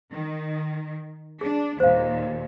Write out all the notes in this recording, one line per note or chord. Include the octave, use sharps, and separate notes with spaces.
D#3
D4 G#4
D#2 A#2 C5 F5